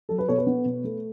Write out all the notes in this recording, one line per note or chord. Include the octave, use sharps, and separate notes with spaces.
F#3 A4
B4
B2 A4 C#5
B4
B3
B2
A3